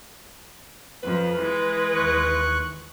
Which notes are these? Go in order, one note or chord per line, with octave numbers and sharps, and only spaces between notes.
F2 F3 B4
E3 G#3
D#2 C#6 F#6